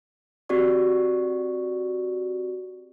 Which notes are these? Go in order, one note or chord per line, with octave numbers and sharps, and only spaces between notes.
C4 F#4 G4 D5 C#6